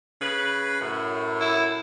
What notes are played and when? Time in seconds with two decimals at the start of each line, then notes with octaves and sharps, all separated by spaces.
0.21 C#3 B4
0.80 F#2 A2
1.41 E4